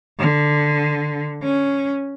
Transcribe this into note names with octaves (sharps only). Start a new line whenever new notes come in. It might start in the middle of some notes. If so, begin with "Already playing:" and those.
D3
C#4